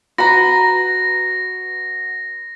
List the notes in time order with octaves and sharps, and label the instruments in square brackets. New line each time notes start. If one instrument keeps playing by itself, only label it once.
[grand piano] F#4 [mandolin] B4 A#5 [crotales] A#6